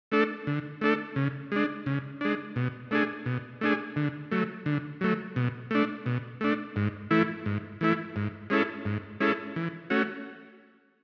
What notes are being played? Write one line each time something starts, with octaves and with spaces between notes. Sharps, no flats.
A3 D4 A4
D3
A3 D4 A4
C#3
G#3 D4
C#3
G#3 D4
B2
A3 D4 G#4
B2
A3 D4 G#4
D3
F#3 A3
D3
F#3 A3
B2
A3 D4
B2
A3 D4
G#2
E3 A3 E4
G#2
E3 A3 E4
G#2
G#3 C#4 E4 A4
G#2
G#3 C#4 E4 A4
E3
A3 C#4 F#4